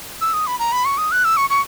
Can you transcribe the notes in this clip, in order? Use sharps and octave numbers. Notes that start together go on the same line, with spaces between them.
E6
D#6
B5
A#5
B5
C#6
D#6
F#6
E6
C#6
C#6